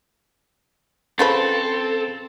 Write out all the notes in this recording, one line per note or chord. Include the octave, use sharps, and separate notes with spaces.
C#3 F3 C4 A4 B4 C5 A6